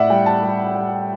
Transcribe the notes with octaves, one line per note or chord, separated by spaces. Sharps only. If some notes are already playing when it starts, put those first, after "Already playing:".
Already playing: A2 D5 E5 F#5
G3 G5
A5
G3
G3